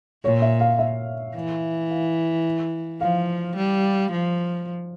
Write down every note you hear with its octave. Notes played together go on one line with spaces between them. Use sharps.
A#2 C#5
E5
F5
E5
E3
F5
F3 F5
G3
F3